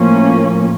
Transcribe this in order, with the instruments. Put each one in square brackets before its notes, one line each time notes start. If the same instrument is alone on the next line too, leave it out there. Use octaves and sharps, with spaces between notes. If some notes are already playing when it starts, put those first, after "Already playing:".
Already playing: [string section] A2 F3 A#3 C#4